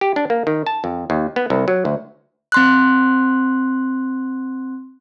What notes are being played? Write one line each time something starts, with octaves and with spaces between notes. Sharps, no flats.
G4
D4
A#3
D#3
A5
F2
D#2
B3
C2
F#3
D2
C4 C6 F#6